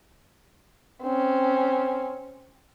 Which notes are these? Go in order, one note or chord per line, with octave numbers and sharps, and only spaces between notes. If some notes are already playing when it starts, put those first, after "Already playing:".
C4 C#4